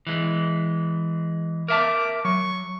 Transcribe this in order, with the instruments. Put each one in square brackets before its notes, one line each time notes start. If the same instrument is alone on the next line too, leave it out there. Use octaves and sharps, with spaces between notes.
[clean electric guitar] E3 G#3
[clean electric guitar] A#4 E5 A5 [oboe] D6
[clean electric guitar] F#3 [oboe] C#6